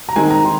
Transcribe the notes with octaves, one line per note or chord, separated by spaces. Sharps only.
A#5
D#3 G#3 C4 G#5
A#5
D#3 C6